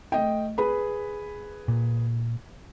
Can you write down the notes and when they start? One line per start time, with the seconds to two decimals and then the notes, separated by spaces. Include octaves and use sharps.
0.12 A3 D#5 G5
0.58 G#4 B4 B5
1.68 A#2